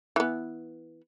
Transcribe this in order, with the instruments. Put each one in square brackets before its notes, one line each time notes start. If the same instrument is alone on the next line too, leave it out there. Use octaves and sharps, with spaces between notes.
[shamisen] E3 B3